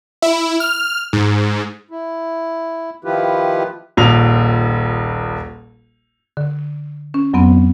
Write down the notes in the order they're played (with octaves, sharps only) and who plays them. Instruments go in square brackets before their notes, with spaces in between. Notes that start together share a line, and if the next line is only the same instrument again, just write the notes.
[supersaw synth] E4
F6
G#2
[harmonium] E4
D#3 F3 E4 F4 G4 B4
[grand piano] D#1 A#1 F7
[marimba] D3
C#4
F2 F#3 B3 C4